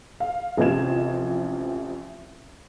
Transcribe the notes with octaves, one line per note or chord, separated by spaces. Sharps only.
F5
A1 C3 F3 D#5 G#6 E7